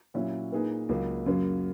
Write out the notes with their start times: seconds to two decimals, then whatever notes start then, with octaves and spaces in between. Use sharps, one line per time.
0.14 A#2 F#3 C#4 E4
0.52 A#2 A#3 D#4 G#4 B4
0.89 C#2 C#3 F#3 A#3
1.26 F#2 C#3 F#3 A#3